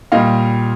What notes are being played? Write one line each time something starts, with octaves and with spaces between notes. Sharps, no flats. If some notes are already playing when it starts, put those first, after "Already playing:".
A#2 G3 D#5 F5